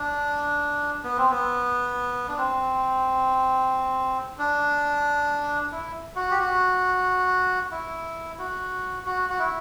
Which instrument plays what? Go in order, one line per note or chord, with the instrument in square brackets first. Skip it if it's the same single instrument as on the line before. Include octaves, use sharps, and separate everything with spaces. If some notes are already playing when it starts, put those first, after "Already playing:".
Already playing: [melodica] D4
B3
C4
B3
D4
C4
D4
E4
F#4
G4
F#4
E4
F#4
F#4
F#4
E4